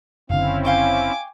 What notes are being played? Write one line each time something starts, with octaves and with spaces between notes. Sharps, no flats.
F#1 D3 C4 C#4 E4 F5
F5 G5 G#5 C#6 D6